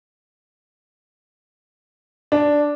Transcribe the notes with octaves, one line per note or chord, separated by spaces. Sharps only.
D4